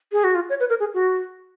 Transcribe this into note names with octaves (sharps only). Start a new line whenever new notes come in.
G#4
F#4
F4
C#5
B4
A#4
G#4
F#4